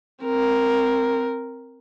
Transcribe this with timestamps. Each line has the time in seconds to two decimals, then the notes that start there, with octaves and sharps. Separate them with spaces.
0.24 C4 A#4